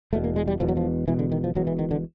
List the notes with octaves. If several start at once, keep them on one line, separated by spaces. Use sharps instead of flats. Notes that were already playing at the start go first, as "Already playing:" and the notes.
E1 E2 B2 A3
A#3
G#3
G3
E1 E2 B2 F3
F#3
F3
E1 E2 B2 E3
D3
D#3
F3
E1 E2 B2 F#3
E3
D#3
D3